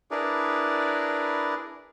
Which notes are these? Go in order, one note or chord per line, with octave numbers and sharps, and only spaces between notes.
D4 E4 G#4 A#4 B4 D5